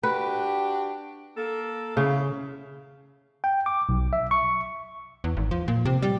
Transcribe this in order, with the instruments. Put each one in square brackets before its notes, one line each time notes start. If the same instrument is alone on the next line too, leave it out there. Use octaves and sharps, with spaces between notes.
[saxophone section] D4 F#4 G4 [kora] B4
[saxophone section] A#3 A4
[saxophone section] E2 E4 F5 [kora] C#3
[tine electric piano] G5
D6
B1
E5
C#6
[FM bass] E2
G#1
F3
A#2
C3
G3